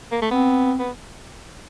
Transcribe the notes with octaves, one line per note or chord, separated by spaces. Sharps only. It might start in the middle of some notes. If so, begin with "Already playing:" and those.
A#3
A3
B3 C4
B3